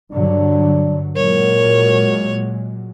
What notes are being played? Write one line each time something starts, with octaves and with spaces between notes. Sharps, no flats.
G2 D3 F#3 D4
A#2 F#3 G#3 A#4 C#5